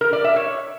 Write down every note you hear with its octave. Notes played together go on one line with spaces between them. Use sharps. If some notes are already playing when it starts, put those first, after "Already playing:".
A#4
D5
E5
C#5